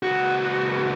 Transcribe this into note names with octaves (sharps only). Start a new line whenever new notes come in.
C#2 F#4